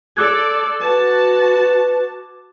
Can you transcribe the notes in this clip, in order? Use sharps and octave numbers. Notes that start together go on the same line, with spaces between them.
A4 D5 D6 F#6 G#6
F#4 B4 A5